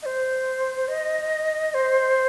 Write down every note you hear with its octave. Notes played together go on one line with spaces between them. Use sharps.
D#5
C5
D#5
C5